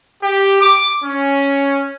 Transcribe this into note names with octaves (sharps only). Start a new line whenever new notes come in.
G4
D6
C#4